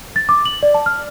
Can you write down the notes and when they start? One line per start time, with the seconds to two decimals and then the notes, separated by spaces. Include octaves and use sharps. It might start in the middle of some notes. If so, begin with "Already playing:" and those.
0.16 A6
0.29 D6
0.45 F#7
0.63 D5
0.74 A5
0.86 F6